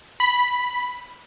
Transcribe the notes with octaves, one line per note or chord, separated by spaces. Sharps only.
B5